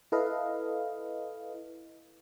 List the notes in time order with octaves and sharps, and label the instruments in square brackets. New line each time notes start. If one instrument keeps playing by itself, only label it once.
[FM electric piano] E4 A4 B4 D#5 F5